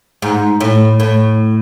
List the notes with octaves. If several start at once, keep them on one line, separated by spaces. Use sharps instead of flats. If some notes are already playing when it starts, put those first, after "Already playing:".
G#2
A2
A2